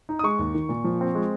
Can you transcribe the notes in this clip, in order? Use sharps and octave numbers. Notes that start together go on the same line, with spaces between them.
D#4
D#6
G#3 C#6
D#2
D#3
A#2
F3
C4
G#3